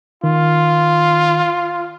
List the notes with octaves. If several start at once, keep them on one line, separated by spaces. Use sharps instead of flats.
D#3 F4